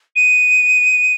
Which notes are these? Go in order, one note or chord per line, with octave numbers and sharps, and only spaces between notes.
D#7